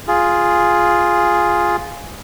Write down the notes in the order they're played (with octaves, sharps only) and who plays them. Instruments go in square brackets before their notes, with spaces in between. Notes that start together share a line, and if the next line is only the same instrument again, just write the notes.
[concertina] F4 G#4